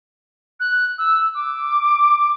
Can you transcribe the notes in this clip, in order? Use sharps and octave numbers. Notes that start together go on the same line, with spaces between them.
F#6
E6
D6